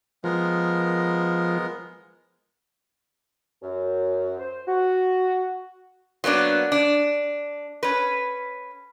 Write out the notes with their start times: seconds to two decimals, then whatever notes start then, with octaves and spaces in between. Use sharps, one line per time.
0.24 F3 G#3 B3 A#4
3.62 F#2
4.39 C5
4.68 F#4
6.24 F#3 A#3 B3 D4
6.72 D4
7.83 C#4 B4